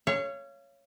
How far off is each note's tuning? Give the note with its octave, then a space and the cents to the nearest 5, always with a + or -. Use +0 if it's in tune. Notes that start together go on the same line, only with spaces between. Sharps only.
C#5 +0 F5 -35